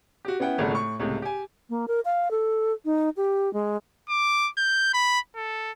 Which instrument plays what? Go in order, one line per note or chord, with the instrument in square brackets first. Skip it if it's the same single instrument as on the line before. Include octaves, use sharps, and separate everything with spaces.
[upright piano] F#4 G4
B3 C#4 E4 F#5 G5
G#1 A#2 C#3 A4 F#5
A2 C#6
C#2 A2 C3
G4 G#5
[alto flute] A#3
A#4
F5
A4
D#4
G4
G#3
[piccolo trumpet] D6
G6
B5
A4